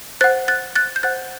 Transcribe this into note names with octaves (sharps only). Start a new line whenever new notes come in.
C5 F#5 F#6 A6
F#6 A6
F#6 A6
G6
C5 F#5 F#6 A6